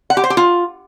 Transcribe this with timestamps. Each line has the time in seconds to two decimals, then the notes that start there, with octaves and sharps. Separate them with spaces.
0.10 F#5
0.17 G4
0.24 C5
0.30 G4
0.37 F4